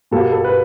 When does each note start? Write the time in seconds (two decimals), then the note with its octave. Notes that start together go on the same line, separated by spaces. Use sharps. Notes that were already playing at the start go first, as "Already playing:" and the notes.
0.11 B2 G3 A#3 A4
0.32 A4
0.44 B4